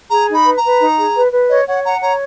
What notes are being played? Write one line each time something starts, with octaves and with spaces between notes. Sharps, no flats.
G#4 A#5
D#4
B5
B4
A#5
B4
D#4
G#4
B4
B4
C#5 D#5
C#5 F#5
F#5 A#5
C#5 A#5